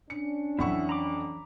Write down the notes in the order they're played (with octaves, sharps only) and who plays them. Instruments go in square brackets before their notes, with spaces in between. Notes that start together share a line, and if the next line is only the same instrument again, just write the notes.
[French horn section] C#4 D4 [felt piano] C#7
[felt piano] F2 F#5 C#6 [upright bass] E3 F#3 [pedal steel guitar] E4 E5
[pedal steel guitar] A#5 B5 D6